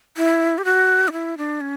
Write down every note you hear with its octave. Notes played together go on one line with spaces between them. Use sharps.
E4
G4
F#4
D4
E4
D4
C#4